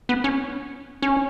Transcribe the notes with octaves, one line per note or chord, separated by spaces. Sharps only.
B3
C#4
C#4